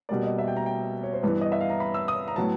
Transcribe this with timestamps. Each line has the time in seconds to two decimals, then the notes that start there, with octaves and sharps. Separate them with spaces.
0.09 B2 G3 A#3 D5
0.23 D#5
0.38 E5
0.48 G5
0.57 A#5
0.66 G5
1.04 C#5
1.13 C5
1.23 G2 E3 G3 B3 B4
1.41 D#5
1.52 E5
1.61 F5
1.70 A#5
1.80 B5
1.94 E6
2.08 D#6
2.28 A#5
2.36 A2 F#3 B3 A5